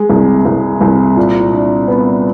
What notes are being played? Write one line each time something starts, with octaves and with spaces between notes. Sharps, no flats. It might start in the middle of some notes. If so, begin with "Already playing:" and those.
Already playing: G#3
C2
C2
C2
A#2
D4
B3